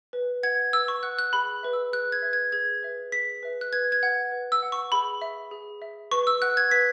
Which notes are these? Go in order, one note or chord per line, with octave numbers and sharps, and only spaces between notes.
B4
F#5 G#6
B4 E6
C#6
F#5 F#6
F#6
G#4 B5
B4 E5
E6
G#4 F#6
G#6
B4 E5
G#6
G#4 G#6
B4 E5
G#4 B6
B4 E5
F#6
B4 G#6
G#6
F#5
B4
E6
F#5
C#6
G#4 B5
E5
G#4
E5
B4 C#6
E6
F#5 F#6
G#6
B4 B6